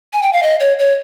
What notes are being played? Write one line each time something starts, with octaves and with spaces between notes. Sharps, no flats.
G#5
G5
F5
D#5
C#5
C#5